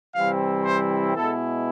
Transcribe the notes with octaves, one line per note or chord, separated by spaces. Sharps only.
C3 E3 G3 C4 E4 F5
C5
B2 G#3 B3 E4 A4